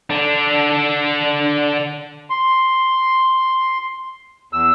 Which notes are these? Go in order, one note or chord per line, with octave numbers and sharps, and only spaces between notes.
D3 D4
C6
E2 E6